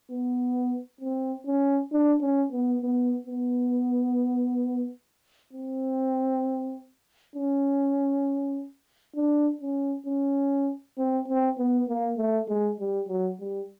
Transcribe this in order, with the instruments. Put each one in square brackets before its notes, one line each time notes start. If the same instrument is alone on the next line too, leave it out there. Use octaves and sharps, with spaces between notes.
[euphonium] B3
C4
C#4
D4
C#4
B3
B3
B3
C4
C#4
D4
C#4
C#4
C4
C4
B3
A#3
A3
G#3
G3
F#3
G3